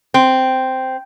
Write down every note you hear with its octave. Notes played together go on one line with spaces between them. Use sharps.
C4